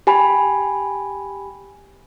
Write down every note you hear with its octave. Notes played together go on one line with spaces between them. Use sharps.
G4 G#5 B5